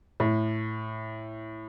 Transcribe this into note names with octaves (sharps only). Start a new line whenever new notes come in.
A2